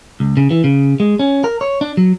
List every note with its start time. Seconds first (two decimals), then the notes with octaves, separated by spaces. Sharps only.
0.20 C#2
0.37 C#3
0.51 E3
0.64 C#3
1.00 G#3
1.19 C#4
1.44 A#4
1.61 C#5
1.81 D4
1.97 F#3